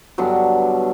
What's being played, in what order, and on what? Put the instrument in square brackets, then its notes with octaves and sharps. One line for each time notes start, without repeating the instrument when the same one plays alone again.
[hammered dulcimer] G2 B2 D3 F#3